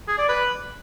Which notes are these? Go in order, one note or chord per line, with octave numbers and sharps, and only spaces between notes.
G#4
D5
B4